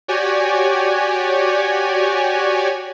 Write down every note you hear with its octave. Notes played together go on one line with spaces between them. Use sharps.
F#4 G4 C#5 D5 G#5